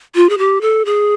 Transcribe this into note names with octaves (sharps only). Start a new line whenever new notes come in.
F4
G#4
G4
A4
G#4